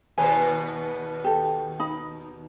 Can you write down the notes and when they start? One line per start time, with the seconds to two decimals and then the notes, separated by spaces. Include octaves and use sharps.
0.18 D#2 B2 B3 C5 G#5
1.24 G4 A4
1.80 D#4 B5